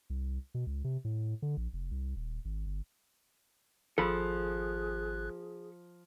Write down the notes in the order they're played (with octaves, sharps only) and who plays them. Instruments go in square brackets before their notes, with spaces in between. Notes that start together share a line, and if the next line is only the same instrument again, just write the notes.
[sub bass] C2
B2
C#2
C3
A2
D3
A#1
F1
C2
D#1
G#1
G1
[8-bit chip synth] G#1 F#6 [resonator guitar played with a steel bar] F3 [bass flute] G#4 [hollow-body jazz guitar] A4 B5